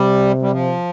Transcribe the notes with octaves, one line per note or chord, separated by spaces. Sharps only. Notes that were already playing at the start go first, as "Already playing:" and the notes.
Already playing: C3 G3
G3
F3